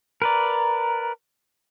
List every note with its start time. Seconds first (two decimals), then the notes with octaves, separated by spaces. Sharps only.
0.22 A#4 B4 D5 A#5